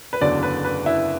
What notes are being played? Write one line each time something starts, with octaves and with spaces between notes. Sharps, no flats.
B4
F#1 E2 D3 F#3 D5
B4
B4
E4